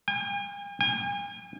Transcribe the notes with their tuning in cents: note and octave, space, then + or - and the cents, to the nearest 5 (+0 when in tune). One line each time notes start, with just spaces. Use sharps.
G#5 -45
G#5 -40